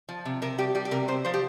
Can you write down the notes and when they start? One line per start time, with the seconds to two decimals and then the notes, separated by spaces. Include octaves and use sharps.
0.09 F3
0.25 C3
0.42 C3 A#4
0.58 G3 G4
0.75 G3 G4
0.85 G4
0.91 C3 A#4
1.08 C3 C5
1.25 F3 C5
1.34 G4